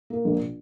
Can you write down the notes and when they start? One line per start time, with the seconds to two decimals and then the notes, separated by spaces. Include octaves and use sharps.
0.10 A#3
0.25 A#1